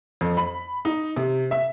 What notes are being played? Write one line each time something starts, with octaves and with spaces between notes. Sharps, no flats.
F2
B5
D#4
C3
E5